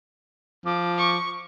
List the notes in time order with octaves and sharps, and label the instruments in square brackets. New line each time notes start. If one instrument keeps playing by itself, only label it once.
[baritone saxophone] F3 [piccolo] D6
[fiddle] C#6